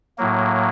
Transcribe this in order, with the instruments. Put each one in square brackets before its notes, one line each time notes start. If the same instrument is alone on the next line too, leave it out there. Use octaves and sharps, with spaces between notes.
[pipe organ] A2 F#3 A#3